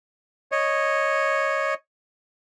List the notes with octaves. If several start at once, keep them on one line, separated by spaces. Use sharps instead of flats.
C#5 D#5